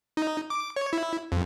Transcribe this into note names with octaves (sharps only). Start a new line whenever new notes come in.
D#4
D6
C#5
E4
F2